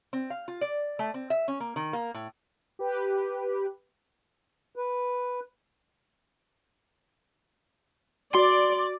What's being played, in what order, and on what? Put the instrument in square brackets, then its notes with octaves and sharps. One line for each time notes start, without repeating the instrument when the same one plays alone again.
[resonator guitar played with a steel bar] C4
F5
F4
D5
A3
C4
E5
C#4
A#3
D#3
A#3
A2
[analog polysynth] G4 B4
[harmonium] B4
[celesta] F#4 [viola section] D5 [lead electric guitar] C6